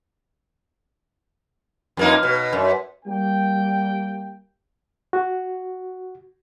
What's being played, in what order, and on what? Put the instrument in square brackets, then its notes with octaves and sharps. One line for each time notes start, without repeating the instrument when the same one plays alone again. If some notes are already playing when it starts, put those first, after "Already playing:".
[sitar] F2 A#3 D#4
B2
F#2
[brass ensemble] G3 A#3 G5
[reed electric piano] F#4